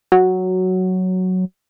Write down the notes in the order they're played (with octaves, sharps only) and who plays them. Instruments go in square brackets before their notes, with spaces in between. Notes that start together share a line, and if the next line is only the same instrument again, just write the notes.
[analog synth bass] F#3